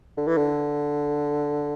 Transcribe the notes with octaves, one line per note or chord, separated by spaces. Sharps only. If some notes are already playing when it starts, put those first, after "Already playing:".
D3
E3
D3